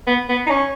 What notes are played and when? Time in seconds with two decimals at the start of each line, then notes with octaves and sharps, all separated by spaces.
0.07 B3
0.29 B3
0.46 D#4
0.50 C#4